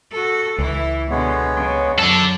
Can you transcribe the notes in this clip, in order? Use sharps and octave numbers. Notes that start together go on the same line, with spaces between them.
F#4 A4
C#2 E3 E4
B2 D3 G#3 B3 C#5
C#3
F#2 D4 A4